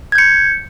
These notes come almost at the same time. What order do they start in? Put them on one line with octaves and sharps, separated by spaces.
G#6 G6 C#7